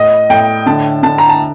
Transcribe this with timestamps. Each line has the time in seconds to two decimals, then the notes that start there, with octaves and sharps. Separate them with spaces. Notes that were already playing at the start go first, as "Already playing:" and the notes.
Already playing: A2 D#5
0.30 A2 G5
0.66 D3 A5
1.03 D3 A5
1.18 A#5
1.29 A5